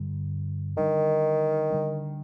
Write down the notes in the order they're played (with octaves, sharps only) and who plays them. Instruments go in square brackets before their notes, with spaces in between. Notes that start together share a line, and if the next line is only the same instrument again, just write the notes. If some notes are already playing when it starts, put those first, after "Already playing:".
Already playing: [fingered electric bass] G2 D3 G3
[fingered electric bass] D3 G3 D4 [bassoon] D#3
[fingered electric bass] D3 G3 D4